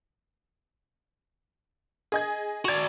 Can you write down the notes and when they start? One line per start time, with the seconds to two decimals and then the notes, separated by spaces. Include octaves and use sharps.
2.12 G#4 D#5 G#6
2.65 F#4 D5 G#6 F7